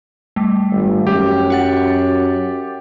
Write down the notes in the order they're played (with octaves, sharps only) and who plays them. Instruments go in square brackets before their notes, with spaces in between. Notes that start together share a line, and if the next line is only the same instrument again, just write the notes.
[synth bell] G3 A3
[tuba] G#1
[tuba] F#2 [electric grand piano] G4
[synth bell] F#4 F#5 A6